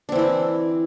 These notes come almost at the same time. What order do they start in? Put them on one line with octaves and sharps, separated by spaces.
D4 C4 E3 E4